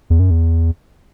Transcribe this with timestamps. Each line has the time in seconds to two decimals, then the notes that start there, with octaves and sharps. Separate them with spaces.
0.10 E2
0.19 F#2
0.31 E2